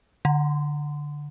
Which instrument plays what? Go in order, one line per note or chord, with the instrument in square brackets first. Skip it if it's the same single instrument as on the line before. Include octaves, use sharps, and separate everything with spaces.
[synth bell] D3